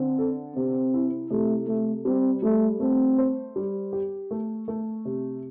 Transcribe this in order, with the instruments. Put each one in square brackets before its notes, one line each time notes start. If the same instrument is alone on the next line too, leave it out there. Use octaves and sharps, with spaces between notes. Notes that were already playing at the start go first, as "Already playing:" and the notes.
Already playing: [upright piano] D3 [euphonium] C4
[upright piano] A4
[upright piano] C3 [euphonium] C4
[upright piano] E4
[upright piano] C3 [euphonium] A3
[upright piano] C3 [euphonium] A3
[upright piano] G3 [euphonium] C4
[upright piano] G3 [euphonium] A3
[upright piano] A3 [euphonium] C4
[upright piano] C5
G3
G4
A3
A3
C3